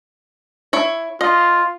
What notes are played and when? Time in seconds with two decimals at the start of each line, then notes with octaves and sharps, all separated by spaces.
0.73 E4 C#5
1.21 F4 D#5